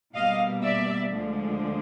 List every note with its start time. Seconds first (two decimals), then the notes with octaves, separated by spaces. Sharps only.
0.15 B2 G3 A#3 D#5 F5
0.63 D5 E5
1.12 D2 D3 F3 G#3